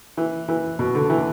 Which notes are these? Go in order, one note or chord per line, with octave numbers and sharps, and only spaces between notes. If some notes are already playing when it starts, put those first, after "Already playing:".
E3
E3
B2
D3
E3